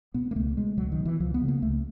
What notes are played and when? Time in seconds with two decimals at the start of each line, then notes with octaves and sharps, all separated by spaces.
0.14 B2 B3
0.31 A#3
0.36 C#2 A3
0.57 B2 G#3
0.77 C#2 F#3
0.92 D#3
0.98 B2
1.05 E3
1.20 C#2 F3
1.34 B3
1.41 C#3
1.48 A#3
1.62 C#2 A3